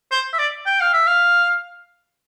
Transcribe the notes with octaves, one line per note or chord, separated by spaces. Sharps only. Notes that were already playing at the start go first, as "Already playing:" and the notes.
C5
E5
D5
G5
F5
E5
F5